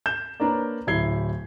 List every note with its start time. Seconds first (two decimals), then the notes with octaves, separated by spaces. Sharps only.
0.06 G6 E7
0.40 A#3 D4 A#4 B4 C#5 D5
0.87 D1 E4 G#6 C7 G7